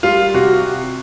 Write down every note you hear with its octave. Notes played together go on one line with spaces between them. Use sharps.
G3 F4
C3 F#4